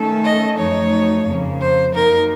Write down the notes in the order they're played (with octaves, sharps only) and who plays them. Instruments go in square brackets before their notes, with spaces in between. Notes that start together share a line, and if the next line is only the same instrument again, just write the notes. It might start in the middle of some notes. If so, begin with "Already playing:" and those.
Already playing: [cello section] D#3 A3 C#4 A4
[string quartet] D#5
[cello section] F#2 F3 A3 D#4 [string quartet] C#5
[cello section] F2 C#3 F3 A#3
[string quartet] C5
[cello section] F#2 F3 A#3 D#4 [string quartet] A#4